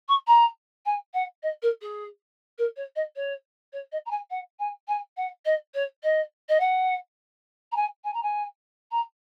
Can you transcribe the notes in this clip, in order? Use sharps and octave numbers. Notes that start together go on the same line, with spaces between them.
C#6
A#5
G#5
F#5
D#5
A#4
G#4
A#4
C#5
D#5
C#5
C#5
D#5
A#5
G#5
F#5
G#5
G#5
F#5
D#5
C#5
D#5
D#5
F#5
A#5
G#5
G#5
A#5
G#5
A#5